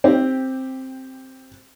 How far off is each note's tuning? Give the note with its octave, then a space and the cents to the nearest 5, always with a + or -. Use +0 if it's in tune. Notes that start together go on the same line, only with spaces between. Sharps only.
C4 +5 G4 +0